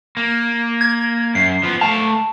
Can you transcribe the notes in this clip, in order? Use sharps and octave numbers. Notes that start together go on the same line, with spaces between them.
A#3
G#6
F#2 C7
F3 B3
A3 F5 A5